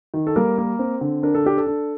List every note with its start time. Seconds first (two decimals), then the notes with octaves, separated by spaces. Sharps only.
0.14 D#3
0.27 A4
0.36 G3 A#3 A#4
0.58 A#3
0.79 C4
1.01 D3
1.23 D4 A#4
1.35 A4
1.44 D4 G4
1.58 A4
1.67 D4